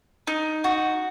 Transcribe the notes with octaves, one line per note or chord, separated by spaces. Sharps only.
D#4
F#4